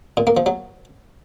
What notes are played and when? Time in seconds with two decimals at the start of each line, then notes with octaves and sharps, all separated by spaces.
0.17 A#2
0.27 A#3
0.37 F3
0.46 F#3